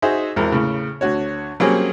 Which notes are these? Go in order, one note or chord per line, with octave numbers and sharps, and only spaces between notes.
D#4 F#4 G#4 C5 E5
G#1 E2 G#3 A#4 C5
A2 C#3
D2 D3 F#4 C#5
F#3 G3 A#3 C4 C#4 G#4